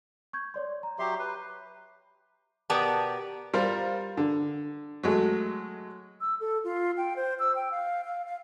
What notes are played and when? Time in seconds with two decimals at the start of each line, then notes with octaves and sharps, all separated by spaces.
0.33 C#6 G6 G#6
0.54 C#5 D5 C6
0.83 A#5
0.99 F#3 G4 E5 C6
1.19 B4
2.70 B2 B3 G4 A#4 D5 A5
3.54 G3 F4 A#4 C5
4.17 D3
5.03 F#3 G#3 A3
6.21 E6
6.40 A4
6.64 F4
6.97 G5
7.16 C5
7.40 E6
7.56 G5
7.71 F5
8.04 F5
8.26 F5